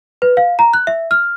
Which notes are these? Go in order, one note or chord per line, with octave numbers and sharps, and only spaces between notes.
B4
F5
A#5
F#6
E5
F6